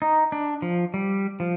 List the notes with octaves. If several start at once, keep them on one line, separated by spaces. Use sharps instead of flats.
D#4
D4
F3
G3
F3